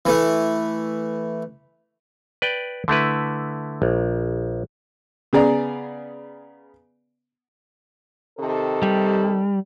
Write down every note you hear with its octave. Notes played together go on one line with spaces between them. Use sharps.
E3 A3
B4 D5 G5
D3 A3 E4 B4
A#1
C#3 B3 G#4 D5 A#5
C3 D#3 A4
G3